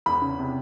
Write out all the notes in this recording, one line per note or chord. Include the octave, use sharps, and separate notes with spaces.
E2 B5
C#3
C3